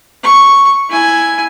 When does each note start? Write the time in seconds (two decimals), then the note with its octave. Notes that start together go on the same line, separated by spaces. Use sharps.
0.23 C#6
0.90 E4 G#5